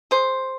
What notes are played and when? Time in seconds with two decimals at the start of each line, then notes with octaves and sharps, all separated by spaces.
0.11 G#4 C5